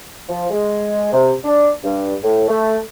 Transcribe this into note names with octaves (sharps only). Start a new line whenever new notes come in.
F3
G#3
C3
D4
G2
A2
A3